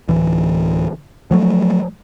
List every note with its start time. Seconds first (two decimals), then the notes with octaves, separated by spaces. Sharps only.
0.08 D1 E3
1.31 F3 F#3 A3